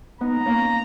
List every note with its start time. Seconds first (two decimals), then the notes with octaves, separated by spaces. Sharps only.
0.21 B3 D#4 A#5
0.40 B3
0.45 A#3 C#4